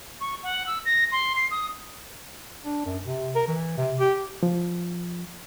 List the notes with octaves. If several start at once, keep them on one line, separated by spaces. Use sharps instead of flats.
C#6
F#5
E6
A#6
C6
C7
D#6
D4
F#2
C3
A#4
E3
C3
G4
F3